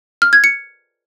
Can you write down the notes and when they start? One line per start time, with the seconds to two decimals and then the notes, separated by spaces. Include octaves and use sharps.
0.22 F6
0.33 G#6
0.44 C#7